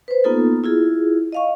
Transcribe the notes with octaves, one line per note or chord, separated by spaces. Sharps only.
B4 C5
A#3 B3 D#4 F4 A4
E4 F4 G#4
D#5 F5 C#6